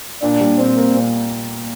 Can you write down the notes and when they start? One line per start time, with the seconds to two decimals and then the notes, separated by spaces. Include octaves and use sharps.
0.22 A#2 D4
0.40 G3
0.58 A#2 C4
0.77 A#3
0.95 A#2